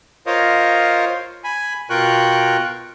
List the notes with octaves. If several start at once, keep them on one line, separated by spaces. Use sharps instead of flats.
F4 A#4 C5 C#5 D#5 F5
G#5 B5
B2 F4 A#4 G5 C#6 F#6